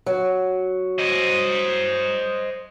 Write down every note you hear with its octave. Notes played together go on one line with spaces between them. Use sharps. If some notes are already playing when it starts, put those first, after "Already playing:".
F#3
C5 D#5